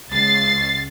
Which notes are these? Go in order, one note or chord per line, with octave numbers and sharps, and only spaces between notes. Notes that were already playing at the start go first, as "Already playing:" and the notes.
C#2 A6 C7